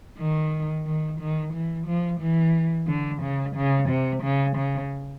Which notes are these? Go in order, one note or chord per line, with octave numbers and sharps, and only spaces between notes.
D#3
D#3
D#3
E3
F3
E3
D3
C#3
C#3
C3
C#3
C#3